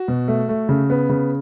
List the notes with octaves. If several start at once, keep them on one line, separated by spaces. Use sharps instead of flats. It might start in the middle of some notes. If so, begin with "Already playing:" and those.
Already playing: F#4
B2
A3
A3
C#3
B3
C#3